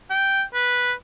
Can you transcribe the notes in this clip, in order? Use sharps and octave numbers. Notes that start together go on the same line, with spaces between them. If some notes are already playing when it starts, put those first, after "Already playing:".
G5
B4